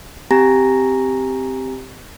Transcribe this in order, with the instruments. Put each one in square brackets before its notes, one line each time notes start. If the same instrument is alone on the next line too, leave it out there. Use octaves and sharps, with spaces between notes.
[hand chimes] C4 G4 G#5 A#5 A#6